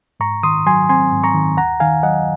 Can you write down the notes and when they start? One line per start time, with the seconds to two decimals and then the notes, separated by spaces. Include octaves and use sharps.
0.20 G#2 A#5 C#6
0.43 D#3 C6 D#6
0.66 F#3 G#5 C6
0.89 C4 G#5 C6
1.13 G#2
1.23 A#5 C#6
1.34 D#3
1.57 D#2 F#5 A#5
1.80 D#3 F5 G#5
2.03 F#3 D#5 F#5